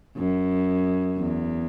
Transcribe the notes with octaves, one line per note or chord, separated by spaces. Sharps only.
F#2
E2